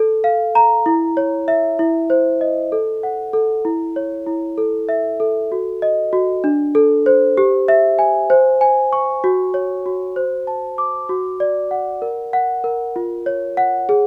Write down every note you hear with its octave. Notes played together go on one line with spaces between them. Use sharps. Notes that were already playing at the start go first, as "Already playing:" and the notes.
Already playing: A4
F5
A#5
E4
C#5
E5
E4
C5
D#5
A4
F#5
A4
E4
C#5
E4
A4
E5
A4
F#4
D#5
F#4
D4
A4
C5
G4
E5
G#5
C5
G#5
C#6
F#4
C#5
F#4
C5
A5
D6
F#4
D5
F#5
A#4
F#5
A#4
F4
C#5
F#5
G#4